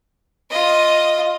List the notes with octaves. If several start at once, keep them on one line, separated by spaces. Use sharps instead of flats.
F4 D#5